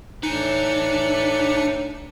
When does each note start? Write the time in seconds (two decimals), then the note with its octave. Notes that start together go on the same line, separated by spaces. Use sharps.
0.23 A2 D4 D#4 B4 G#5 C#7